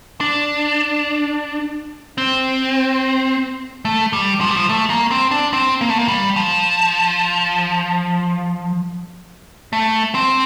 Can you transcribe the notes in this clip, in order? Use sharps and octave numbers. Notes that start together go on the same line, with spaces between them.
D4
C4
A3
G3
F3
G3
F3
A3
A#3
C4
D4
C4
A#3
A3
A#3
G3
F3
A3
C4